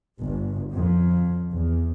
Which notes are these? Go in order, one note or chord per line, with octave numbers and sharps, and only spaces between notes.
G1
F2
E2